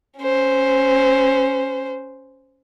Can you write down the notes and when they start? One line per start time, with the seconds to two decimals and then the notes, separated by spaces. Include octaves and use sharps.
0.19 C#4 C5